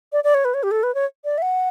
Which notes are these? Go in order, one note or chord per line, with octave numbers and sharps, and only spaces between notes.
D5
D5
C#5
B4
C#5
G4
A4
B4
C#5
D5
E5
F#5